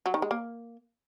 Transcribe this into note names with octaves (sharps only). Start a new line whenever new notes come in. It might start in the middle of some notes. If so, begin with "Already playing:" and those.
F#3
D#3
G#3
A#3